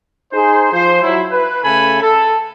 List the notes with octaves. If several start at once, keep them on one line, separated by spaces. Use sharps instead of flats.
D#4 G#4 C5
F3 C5
F#3 E4
B4
C#3 A3 A4 G#5 B5
A4